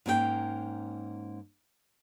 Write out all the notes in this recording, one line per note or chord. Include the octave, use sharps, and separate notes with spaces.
G#2 A#3 C#4 G#4 G5